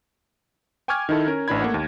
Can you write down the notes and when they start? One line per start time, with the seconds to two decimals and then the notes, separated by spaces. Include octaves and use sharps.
0.88 G5 G#5 C#6 D6 F6 G#6
1.09 D#3 D#4 E4 A4
1.27 C#4 A#4
1.48 A1 E3 D4 B5 G#6
1.62 A3 A#3 F#5
1.74 D#2